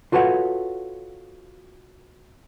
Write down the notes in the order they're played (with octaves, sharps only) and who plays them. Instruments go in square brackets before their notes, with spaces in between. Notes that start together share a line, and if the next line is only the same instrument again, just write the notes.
[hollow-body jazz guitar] F4 F#4 A4 B4 C#5 F#5